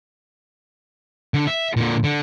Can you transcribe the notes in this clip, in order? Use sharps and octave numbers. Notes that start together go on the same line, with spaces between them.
D3
E5
A#2 D3
D3